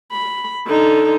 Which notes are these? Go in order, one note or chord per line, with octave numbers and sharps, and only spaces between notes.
B5
D3 D#4